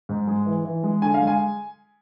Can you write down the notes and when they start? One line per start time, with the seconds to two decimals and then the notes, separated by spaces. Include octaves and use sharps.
0.09 G#2
0.27 G#3
0.46 E3
0.65 E3
0.84 G#3
1.02 D3 G#5
1.14 F5
1.20 G#3
1.27 G#5